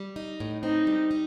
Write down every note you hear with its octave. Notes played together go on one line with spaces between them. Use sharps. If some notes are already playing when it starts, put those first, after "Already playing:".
Already playing: G3
D#4
A2
C4 D#4
G3
D#4